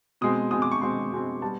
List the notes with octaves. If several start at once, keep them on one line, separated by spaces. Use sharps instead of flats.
B2 G#3 C4 D#6
B2 G#3 C4 D#6
D6
C#6
B2 G#3 C4 C6
B2 G#3 C4
G3 B3 A5